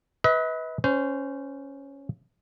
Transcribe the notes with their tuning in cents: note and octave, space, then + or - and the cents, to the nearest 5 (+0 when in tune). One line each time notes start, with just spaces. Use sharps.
B4 +0 D#5 +45
C#4 +0 C5 -20